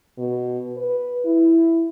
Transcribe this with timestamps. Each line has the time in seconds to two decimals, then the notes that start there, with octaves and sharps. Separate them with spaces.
0.18 B2
0.77 B4
1.25 E4